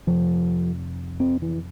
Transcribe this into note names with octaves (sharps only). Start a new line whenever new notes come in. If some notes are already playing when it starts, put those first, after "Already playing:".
F2 C3 F3
C4
E3